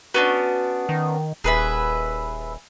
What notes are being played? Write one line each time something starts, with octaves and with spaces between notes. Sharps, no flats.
B3 C#4 D4 F#4
D#3
D#1 G#4 B4 E5